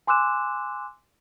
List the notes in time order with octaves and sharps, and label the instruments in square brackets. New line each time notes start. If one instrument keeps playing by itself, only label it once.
[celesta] G#5 C6 D6 E6 F#6 E7